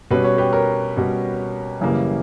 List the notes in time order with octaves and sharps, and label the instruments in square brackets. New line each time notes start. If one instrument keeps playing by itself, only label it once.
[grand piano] B2 G3 C#4 B4
C#5
G4 B4
A#4 C#5
B2 G3 C#4
F#2 C#3 E3 G3 A#3